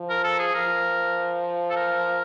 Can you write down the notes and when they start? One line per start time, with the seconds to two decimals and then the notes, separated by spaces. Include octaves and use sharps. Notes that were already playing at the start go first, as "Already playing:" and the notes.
Already playing: F3
0.09 A#4
0.24 A4
0.39 G#4
0.54 F3 A#4
1.70 A4
1.76 A#4